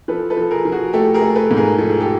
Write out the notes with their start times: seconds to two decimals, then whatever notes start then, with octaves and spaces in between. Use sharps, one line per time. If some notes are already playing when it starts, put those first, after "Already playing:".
0.08 F3 A4 B4
0.30 A4 B4
0.37 F3
0.42 A4
0.51 G#4 A#4
0.65 F3
0.72 F#4 G#4
0.93 A3 G4 A4
1.14 G#4 A#4
1.21 A3
1.35 A4 B4
1.51 G#2
1.57 G#4 A#4
1.78 F3 A4
1.90 G#4
2.00 G4 A4